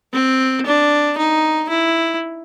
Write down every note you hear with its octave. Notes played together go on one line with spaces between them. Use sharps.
C4
D4
D#4
E4